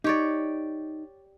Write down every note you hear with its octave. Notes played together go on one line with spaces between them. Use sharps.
D#4 G4 C#5 D5